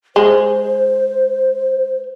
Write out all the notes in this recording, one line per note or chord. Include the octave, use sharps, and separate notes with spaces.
G#3 C5